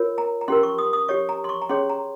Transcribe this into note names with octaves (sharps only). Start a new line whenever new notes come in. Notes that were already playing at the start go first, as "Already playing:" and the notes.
Already playing: F4 A#4 C#5
A#5
A#5
C#4 G4 A#4 C6
C#6
D#6
D#6
G4 C#5 C#6
A#5
C6
C#6
A#5
C#4 G#4 C#5 C6
A#5